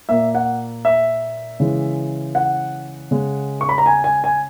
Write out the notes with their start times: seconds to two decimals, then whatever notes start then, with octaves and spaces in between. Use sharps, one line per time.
0.09 A#2 A#3 E5
0.35 F#5
0.85 E5
1.60 C#3 E3 G#3
2.35 F#5
3.11 C#3 G#3
3.61 C#6
3.69 B5
3.78 A#5
3.86 G#5
4.04 G#5
4.24 G#5